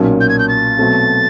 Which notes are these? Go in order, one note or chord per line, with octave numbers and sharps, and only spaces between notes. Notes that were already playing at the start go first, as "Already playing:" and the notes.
Already playing: B1 A#2 F#3 A#3 C#4
G6
G#6
G6
A6
B2 F#3 A3 C4